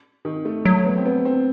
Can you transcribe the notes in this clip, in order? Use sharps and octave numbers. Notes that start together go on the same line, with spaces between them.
D#3
A3
F#3 A3
B3
C4
B3
C4